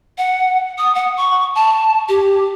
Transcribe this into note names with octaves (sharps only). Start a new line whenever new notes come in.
F#5
D#6
F#5
C#6
A5
G4